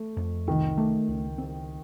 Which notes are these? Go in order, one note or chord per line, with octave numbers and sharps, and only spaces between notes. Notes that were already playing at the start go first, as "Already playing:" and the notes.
Already playing: A3
F2
C2 D#3
A3
C#2
C4